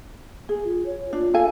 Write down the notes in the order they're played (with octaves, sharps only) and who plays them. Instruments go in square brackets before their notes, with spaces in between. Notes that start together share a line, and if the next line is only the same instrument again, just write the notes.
[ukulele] G#4
[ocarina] F4
C#5
[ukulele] D4 [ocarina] F4
[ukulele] A4 F5 G#5